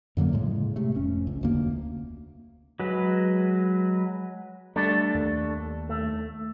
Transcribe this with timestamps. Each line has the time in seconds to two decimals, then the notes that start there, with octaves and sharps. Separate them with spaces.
0.17 F#2 D3 F#3 A#3
0.33 A2 C#3 G#3
0.76 C3 A3
0.95 F1 C#4
1.27 C#2
1.41 F1 D2 A#3
2.80 F#3 G#3 B4
4.76 G3 A3 D4 A4
5.14 D#2
5.89 A3